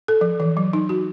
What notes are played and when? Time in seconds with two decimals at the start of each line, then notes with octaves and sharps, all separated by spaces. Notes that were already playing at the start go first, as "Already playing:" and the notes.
0.08 A4
0.21 F3
0.40 E3
0.57 F#3
0.73 D#4
0.89 F#4